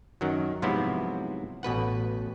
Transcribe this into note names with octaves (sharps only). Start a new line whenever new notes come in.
F#2 D#3 F#3
G#2 C3 F3 F#3 B3 E4
A1 B2 B4 F#5